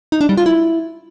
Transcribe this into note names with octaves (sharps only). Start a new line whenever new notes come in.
D#4
D4
G3
F4
E4